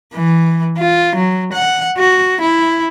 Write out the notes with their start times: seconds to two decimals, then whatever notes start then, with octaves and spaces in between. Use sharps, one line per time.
0.14 E3
0.78 F4
1.16 F#3
1.53 F#5
1.97 F#4
2.41 E4